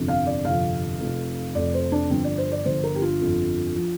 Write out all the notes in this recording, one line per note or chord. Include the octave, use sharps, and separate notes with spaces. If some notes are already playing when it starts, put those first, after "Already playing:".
Already playing: G1 F2 C3 F3
F5
D5
G1 F2 C3 F3 F5
F1 F2 F3
F1 F2 F3 D5
C5
D4
G1 G2 D3 F3 C4
D5
C5
D5
G1 G2 D3 F3 C5
A#4
G4
F4
G1 F2 F3
F3